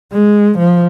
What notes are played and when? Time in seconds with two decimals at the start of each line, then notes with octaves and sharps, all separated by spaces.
0.12 G#3
0.58 F3